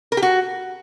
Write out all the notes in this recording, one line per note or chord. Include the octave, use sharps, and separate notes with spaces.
A#4
G4
F#4